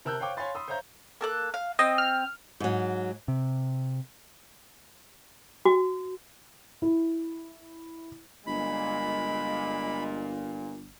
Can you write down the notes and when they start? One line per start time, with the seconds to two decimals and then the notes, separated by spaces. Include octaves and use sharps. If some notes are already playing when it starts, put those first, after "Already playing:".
0.05 C3 A#4 A5 E6 F#6 G6
0.20 C5 C#5 F5 G5 C#6 D6
0.37 C#5 F5 G#5 B5 C6 A6
0.55 B5 C6 D#6 E6
0.68 C5 C#5 E5 F5 A#5 G6
1.21 A#3 A4 F#6
1.54 F5
1.79 C4 D#5
1.98 F6
2.60 G#2 F#3
3.28 C3
5.65 F#4
6.82 E4
8.47 G1 A#2 G#3 B5